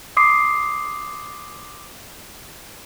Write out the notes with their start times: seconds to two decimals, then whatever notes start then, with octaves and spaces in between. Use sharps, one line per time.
0.17 C6 D6 D#6 C7